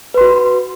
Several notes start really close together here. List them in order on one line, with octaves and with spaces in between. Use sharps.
B4 C6 F#4